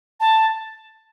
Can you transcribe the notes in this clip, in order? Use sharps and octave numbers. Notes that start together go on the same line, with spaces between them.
A5